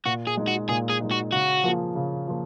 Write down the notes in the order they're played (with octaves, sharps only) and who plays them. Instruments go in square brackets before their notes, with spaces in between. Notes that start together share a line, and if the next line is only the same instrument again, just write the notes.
[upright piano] A#2 [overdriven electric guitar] F#4
[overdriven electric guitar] G#4
[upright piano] G#3 D#4
[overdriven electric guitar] F#4
[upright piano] A#2 [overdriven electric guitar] G#4
[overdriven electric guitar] G#4
[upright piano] G#3 D#4
[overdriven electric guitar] F#4
[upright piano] C#3 [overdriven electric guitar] F#4
[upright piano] F3 A#3 F4 G#4
C#3
F3 A#3 F4